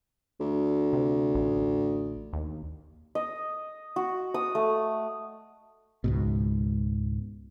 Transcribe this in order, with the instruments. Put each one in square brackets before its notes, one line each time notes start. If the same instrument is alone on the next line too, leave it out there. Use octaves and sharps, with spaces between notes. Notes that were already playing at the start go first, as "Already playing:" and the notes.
[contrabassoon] D2
[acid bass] C3
A1
D#2
[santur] D#5
F#4
D#6
A3
[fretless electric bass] C#2 G#2 B2